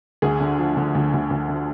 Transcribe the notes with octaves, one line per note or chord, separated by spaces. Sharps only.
D2 G#4
D3
F3
D3
D2
D2
D2
D3